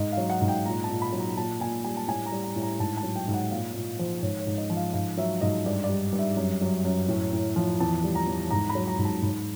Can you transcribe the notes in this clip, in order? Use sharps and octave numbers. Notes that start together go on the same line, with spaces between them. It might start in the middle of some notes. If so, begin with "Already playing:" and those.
Already playing: G#2 D#5
F5
F#3
F#5
G#2
G5
A#2 A#5
A5
A#2
B5
F#3
A#5
A#2 A5
A#2 G#5
G3 G#5
A5
A2 G#5
A#5
G3
A#5
A2
A#5
G#2 A5
A5
F#3
G5
G#2
F#5
A#2 F5
A#2
F3 C5
G#2 C#5
C#5
G#2
D#5
F3
F5
G#2 F5
F#3 E5
G#2 D#5
G2 D5
D5
G3
G2
E5
F#2
F#3
F#2
A2
A2
F3
E2 A5
G3
A#5
E2
G#2 A#5
B5
F#3
A#5
G#2
A5
G#2